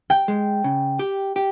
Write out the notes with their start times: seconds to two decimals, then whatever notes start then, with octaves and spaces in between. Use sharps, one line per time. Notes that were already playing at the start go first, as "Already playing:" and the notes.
0.10 G5
0.28 G#3
0.64 C#3
0.99 G4
1.36 G4